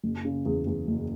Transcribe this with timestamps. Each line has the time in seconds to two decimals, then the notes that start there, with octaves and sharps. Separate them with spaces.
0.04 F#1
0.25 C#3
0.46 E2
0.67 E2
0.88 F#1